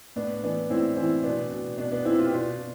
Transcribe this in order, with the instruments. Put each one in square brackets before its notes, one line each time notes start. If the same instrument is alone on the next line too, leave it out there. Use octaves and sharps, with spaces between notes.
[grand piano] A2 B3 D4
E3 B3 D4
A2 C4 E4
E3 C4 E4
B2 B3 D4
B2
B2 B3 D4
B3 D4
B2 C4 E4
F4
G4
B2 D4 F4
B2